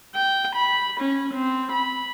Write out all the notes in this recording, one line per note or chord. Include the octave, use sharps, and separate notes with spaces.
G5
B5
C#4
C4
B5